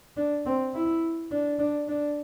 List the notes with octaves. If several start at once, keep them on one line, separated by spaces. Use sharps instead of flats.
D4
C4
E4
D4
D4
D4